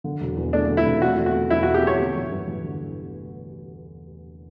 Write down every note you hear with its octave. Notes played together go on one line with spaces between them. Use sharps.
D3
E1
E2
A3 D4
D3
E4
E1
A3 F#4
E2
F#4
B2
E2 E4
F#4
A3
G4
E2 C#5
D3
A1
G2
A1
D3